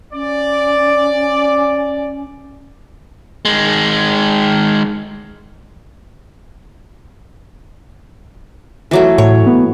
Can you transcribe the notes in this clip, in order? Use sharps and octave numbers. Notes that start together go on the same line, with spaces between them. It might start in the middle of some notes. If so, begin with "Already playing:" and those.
C#4 D5
D#3 G#3
E3 F#3 A3
A2 C#5
B3